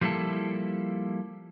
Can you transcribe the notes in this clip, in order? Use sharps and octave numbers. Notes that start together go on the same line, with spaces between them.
F3 G3 A#3 E4 A4